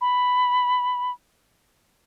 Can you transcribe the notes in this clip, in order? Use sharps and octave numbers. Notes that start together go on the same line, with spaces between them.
B5